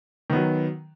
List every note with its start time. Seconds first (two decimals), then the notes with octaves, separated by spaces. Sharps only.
0.30 D#3
0.33 B3
0.36 F#3